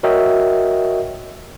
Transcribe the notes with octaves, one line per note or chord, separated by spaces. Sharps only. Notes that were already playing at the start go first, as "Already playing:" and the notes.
F#4 A#4 C#5 D#5 E5 G5